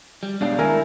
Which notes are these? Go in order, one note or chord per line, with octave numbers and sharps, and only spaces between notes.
G3
B2 G#3 D4 G4 F5
D#3 A3 D4 E4 A#4 G#5